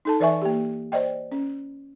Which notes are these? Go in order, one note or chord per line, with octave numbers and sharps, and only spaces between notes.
D#4 A4 A5
E3 B4 D5 E5 G#5 C#6
A#3 G4
C5 D5 D#5 G5
C#4